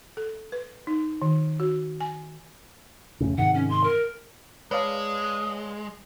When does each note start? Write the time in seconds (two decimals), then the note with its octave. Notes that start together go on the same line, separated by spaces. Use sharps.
0.17 A4
0.52 B4
0.87 D#4
1.22 D#3
1.60 F#4
2.01 G#5
3.20 F2 A2 C#3
3.38 G#2 C3 D#3 F#5
3.55 C#4
3.70 C6
3.84 A#4
4.71 G#3 B4 C#5 D5 F5 A5 D#6